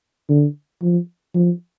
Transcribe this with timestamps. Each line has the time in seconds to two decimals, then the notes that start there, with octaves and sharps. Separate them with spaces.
0.29 D3
0.82 F3
1.34 F3